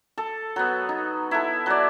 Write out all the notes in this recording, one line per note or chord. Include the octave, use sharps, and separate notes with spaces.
A4
F#3 B3
D#4
E4 A4
F#3 D5